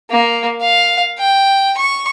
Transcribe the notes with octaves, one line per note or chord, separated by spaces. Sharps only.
A#3
F5
G5
C#6